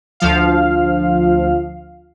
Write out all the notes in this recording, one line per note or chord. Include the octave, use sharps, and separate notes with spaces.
D2 F3 F5